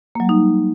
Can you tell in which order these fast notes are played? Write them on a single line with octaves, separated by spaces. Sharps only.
A#3 F#3 G3 D#4